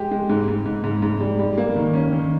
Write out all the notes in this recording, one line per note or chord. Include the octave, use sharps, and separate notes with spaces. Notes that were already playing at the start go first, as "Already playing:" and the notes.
Already playing: G#3 G4
G#3
G#2
G#2
G#2
G#2
G#2
G3
G3
A#3
D#3
C#4
D#3